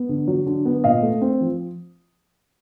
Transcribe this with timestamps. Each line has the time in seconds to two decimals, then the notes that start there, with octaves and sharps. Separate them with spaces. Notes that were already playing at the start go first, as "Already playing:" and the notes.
Already playing: B3
0.09 D3
0.28 F#3
0.46 D3
0.65 B3
0.84 A#2 D#5 F5
1.03 A3
1.22 C4
1.41 F3